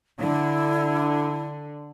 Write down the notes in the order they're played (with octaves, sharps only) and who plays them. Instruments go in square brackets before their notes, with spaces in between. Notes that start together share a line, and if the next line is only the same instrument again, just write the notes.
[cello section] D3 [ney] E4